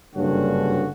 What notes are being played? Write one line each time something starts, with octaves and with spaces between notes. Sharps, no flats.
F#1 G2 D3 C#4 F#4